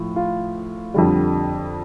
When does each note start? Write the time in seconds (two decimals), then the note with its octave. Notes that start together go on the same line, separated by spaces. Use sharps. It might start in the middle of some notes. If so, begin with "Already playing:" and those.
Already playing: A2 F3
0.16 F4
0.94 F2 D3 G3